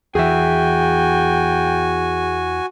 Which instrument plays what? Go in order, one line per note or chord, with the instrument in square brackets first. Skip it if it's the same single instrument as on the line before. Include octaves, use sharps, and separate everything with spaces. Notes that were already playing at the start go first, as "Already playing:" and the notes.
[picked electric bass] E2 E3 [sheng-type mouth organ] F#4 G#5 [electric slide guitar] G#4 E5 [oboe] G5